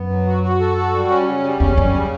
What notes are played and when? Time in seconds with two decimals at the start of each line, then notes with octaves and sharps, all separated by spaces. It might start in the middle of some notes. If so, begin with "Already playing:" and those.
Already playing: F#2 B3
0.09 F#3
0.27 F#4
0.43 F#4
0.60 A4
0.77 F#4
0.94 G3
1.10 C#4
1.27 C#3
1.44 G3
1.60 E2 C#4
1.77 F#2 G3
1.94 C#3